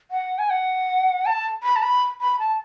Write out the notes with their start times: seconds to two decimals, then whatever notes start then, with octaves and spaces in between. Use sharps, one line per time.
0.11 F#5
0.39 G#5
0.50 F#5
1.26 A5
1.63 B5
1.76 A5
1.82 B5
2.21 B5
2.39 A5